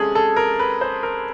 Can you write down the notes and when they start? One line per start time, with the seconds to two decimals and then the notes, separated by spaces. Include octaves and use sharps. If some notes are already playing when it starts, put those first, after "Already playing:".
Already playing: C3 G#3 C#4 G#4 A4
0.15 A4
0.36 A#4
0.59 B4
0.81 C5
1.03 A#4